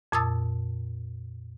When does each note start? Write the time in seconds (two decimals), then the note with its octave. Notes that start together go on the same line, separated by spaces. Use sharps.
0.12 F2 A#2 A5 D#6 E6 A6